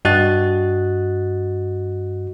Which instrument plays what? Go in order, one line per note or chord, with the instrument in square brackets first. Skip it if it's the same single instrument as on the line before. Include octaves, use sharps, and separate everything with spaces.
[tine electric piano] G2 F#4 D#5 F#6 A6